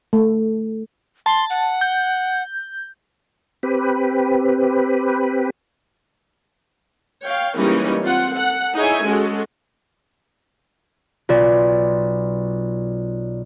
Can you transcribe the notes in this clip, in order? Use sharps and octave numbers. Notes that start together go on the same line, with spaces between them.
A3
A5 C6
F#5
G6
C4 G4 B4
C#5 F5 G5
E3 G3 G#3 A#3 C#4 D#4
C4 F4 F#5
A4 F#5
D#4 E4 G#4 C#5 E5 G#5
G#3 C#4 F#4 G#4 A4
B1 F4 D5